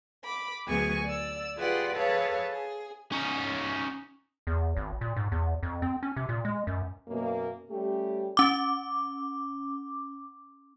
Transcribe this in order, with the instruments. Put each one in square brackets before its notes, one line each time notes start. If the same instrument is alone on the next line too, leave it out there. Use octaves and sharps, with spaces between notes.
[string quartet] B5 D6
D2 F#3 B3 G#4 G#5 C#6
D5 E6
F4 G4 G#4 B4 D5 F#5
G#4 A4 B4 C#5 F5 A5
G#4
[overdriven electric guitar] C#4 D#4
[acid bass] E2
G#1
A#2
G#2
E2
F2
C4
C#4
C3
A#2
G#3
F#2
[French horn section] F#2 B2 A#3
G3 A3 C#4 G4
[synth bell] C#4 D6